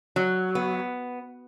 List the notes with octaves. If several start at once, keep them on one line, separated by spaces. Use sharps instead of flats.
F#3
B3